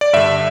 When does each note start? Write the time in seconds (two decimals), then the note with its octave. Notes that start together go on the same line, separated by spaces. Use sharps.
0.01 D5
0.13 G2 D3 E5